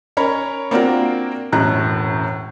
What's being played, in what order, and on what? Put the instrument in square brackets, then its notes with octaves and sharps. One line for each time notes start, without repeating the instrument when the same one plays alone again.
[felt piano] C#4 A#4 C#5 B5
A#3 C4 D4 F4 F#4 A#4
E1 F#2 A2 A#5 F#6